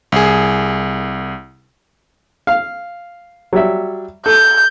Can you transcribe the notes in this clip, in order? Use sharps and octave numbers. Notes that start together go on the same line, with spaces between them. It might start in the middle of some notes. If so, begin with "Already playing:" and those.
C2 G#4
F5
F#3 G3 E5
A4 G6